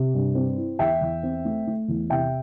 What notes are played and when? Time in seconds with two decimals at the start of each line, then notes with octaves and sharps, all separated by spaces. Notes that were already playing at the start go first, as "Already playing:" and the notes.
Already playing: C3
0.14 G2
0.35 C4
0.57 E4
0.79 E2 E5 G5
1.01 E2
1.23 C4
1.45 A3
1.67 A3
1.88 E2
2.10 C3 E5 G5